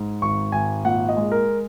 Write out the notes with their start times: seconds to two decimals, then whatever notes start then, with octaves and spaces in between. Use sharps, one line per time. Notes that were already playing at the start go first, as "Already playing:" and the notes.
Already playing: G#2
0.22 G#1 C#6
0.52 G#1 G#5
0.85 A#2 F#5
1.09 D#5
1.17 G#3
1.32 A#4